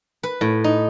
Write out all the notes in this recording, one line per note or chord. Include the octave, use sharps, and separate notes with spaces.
B4
A2
D#4